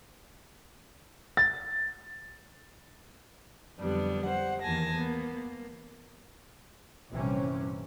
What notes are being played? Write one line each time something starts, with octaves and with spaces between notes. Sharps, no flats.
A6
F2 D3 F#3 G3 B3 D4
C5 F#5
E2 D#3 A#3 G#5 A5 A#6
A#3 B3
A#3
A#1 G2 C3 E3 C4 C#4